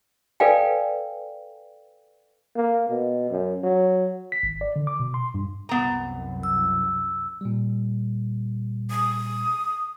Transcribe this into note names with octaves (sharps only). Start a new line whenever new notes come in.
A4 B4 D5 F5 G5 G#5
A#3
B2
F#2
F#3
B6
G#1
D5
D3
D6
B2
C6
G2
C2 F#2 B3 A#5
E6
A#2 G3
D#6